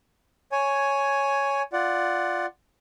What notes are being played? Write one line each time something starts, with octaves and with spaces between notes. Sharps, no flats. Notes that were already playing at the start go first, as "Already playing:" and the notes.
C#5 G#5
F4 D5 F#5